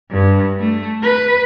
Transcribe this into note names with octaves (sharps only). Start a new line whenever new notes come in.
G2
A3
B4